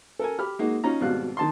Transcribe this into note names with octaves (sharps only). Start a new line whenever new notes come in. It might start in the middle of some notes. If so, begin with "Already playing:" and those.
A4 A#4 G#5
G4 B5 F6
G#3 A#3 D#4 F#4
C#4 D#4 F4 A#5
G#1 B2 G3 F5 F#6
D#3 A5 C6